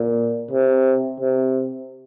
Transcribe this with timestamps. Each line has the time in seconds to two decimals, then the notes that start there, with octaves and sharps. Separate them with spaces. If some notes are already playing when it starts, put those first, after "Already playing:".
Already playing: A#2
0.51 C3
1.20 C3